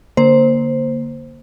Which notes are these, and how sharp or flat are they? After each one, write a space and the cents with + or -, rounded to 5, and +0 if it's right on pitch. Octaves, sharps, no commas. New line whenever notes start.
D3 -15 A#3 +0 C5 +0